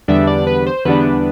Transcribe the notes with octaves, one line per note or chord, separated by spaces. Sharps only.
E2 D3 G3 B3 D4 E5
D5
B4
C5
E2 D3 G3 B3 D4 B4